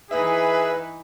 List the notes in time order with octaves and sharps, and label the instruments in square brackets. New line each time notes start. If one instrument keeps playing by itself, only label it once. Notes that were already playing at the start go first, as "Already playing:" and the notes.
[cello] E3 D#4 [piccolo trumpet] G#4 [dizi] B4 [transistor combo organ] E5